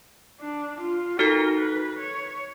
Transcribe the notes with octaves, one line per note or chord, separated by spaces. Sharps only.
D4
F4
D#4 F#4 A4 A#4
B4
C#5